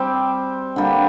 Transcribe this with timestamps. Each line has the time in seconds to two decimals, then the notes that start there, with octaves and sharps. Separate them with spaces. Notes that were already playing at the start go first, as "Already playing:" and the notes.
Already playing: G3 C4 G4
0.76 D3 G3 A#3